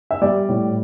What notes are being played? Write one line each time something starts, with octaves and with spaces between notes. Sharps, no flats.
E5
G3 D5
A2